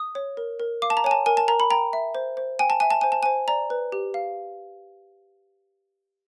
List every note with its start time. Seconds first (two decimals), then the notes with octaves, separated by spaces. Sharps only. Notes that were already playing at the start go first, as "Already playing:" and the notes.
Already playing: D#6
0.15 C#5
0.37 A#4
0.60 A#4
0.82 F5 D6
0.90 A5
0.97 A#5
1.04 C#5 G#5
1.11 A5
1.26 A#4 G#5
1.37 A5
1.48 A#4 A#5
1.60 B5
1.70 G5 A#5
1.93 E5
2.15 C5
2.37 C5
2.59 G5 G#5
2.70 A5
2.80 E5 G#5
2.90 A5
3.01 C5 G#5
3.12 A5
3.23 C5 G#5
3.48 D5 A#5
3.70 B4
3.92 G4
4.14 F5